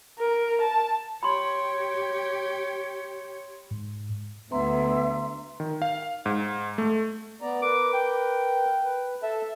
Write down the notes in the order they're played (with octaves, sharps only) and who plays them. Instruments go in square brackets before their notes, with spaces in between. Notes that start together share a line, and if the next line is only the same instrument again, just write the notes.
[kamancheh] A#4
A5
[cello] G4 C#5 [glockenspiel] B5 C6
[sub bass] G#2
[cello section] D2 [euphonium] B3 [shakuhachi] E5 [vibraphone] A#5 C6
[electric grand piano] D#3
F5
G#2
A3
[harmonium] B3 D5 A#5
[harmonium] A#4 B4 [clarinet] D6
[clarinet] G5
[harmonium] B4
[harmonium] A4 A5 [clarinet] E5